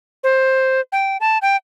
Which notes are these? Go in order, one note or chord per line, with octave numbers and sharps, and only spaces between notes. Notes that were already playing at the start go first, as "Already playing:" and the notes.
C5
G5
A5
G5